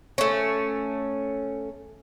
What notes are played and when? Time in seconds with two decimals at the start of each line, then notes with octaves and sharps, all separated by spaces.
0.18 A3 C#4